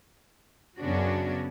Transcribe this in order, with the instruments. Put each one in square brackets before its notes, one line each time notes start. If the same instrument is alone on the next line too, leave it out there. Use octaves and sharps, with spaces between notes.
[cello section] F#2 C#3 B3 C#4 D4 F#4